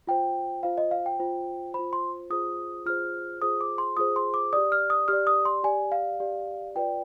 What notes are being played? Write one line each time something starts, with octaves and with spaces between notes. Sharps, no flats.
F4 C5 G5
F4 C5 F5
D#5
F5
G5
F4 C5
F4 C5 B5
C6
F4 G#4 C5 D#6
F4 G#4 C5 F6
F4 G#4 C5 D#6
D6
C6
F4 G#4 C5 D#6
C6
D6
G4 D5 D#6
F6
D#6
G4 D5 F6
D#6
C6
G4 D5 G#5
F5
G4 D5
F4 B4 D5 G5